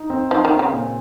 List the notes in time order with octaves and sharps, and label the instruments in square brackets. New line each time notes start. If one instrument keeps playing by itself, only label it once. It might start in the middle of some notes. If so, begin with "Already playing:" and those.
Already playing: [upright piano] D#4
C4
[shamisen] F3 [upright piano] D#4
[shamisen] D#3
[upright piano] C4
[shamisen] C#3
[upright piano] A#2